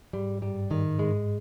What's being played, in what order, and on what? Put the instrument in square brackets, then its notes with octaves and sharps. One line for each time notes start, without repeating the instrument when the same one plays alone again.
[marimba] G#2 [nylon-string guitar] G3
[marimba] G2 [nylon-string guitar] G3
[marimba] G#2 [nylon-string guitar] D#3
[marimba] G#2 [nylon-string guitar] G#3